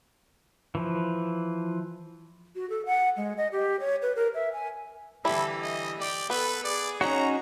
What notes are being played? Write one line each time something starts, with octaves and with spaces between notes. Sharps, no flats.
E3 F3
F#4
A4
F#5
G#3
D#5
G4
C#5
B4
A#4
E5
G#5
D3 E3 G3 E4 A4
D#5
G4 D5 G5
B3 A4 B4
G#4 D5
F#3 C#4 D#4 F#4 A#5